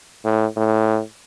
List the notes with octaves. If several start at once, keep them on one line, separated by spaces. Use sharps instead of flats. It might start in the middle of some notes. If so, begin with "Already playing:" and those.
A2
A2